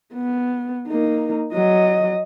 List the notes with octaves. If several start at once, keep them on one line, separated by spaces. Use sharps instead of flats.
B3
A#3 D#4
F#3 D#5